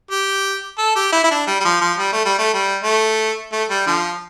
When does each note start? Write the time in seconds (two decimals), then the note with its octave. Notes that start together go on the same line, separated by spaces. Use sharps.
0.11 G4
0.78 A4
0.95 G4
1.12 E4
1.24 E4
1.31 D4
1.47 G3
1.60 G3
1.65 F3
1.81 F3
1.98 G3
2.12 A3
2.25 G3
2.39 A3
2.53 G3
2.84 A3
3.52 A3
3.70 G3
3.87 D3 F3